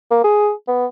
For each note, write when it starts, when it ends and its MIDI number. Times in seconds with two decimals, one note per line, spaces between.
0.11 0.20 58
0.24 0.51 68
0.68 0.86 59